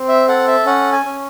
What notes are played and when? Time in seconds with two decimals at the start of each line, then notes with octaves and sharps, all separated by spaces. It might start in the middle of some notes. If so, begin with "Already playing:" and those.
Already playing: C4
0.09 E5
0.28 A4 F#5
0.47 E5
0.66 C#4 F#5
0.93 G#5
1.05 C#4